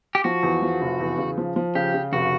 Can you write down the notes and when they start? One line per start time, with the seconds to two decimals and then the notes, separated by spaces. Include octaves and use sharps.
0.15 G4
0.24 F3 F#4
0.43 E2
0.62 F3
0.81 F1
1.00 E2
1.18 C#3
1.38 F3
1.56 F3
1.75 C#3 G4
1.94 C#3
2.12 F1 F#4